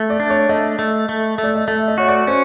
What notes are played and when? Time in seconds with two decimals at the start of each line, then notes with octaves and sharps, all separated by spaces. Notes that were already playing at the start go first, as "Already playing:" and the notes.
Already playing: A3
0.10 D5
0.20 D4
0.30 C#5
0.49 A3 D#5
0.79 A3
1.09 A3
1.38 A3
1.43 D5
1.55 D#5
1.68 A3 E5
1.88 D#5
1.98 F#4 C#5
2.08 D5
2.27 C#4 C5